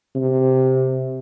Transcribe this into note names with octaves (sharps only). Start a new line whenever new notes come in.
C3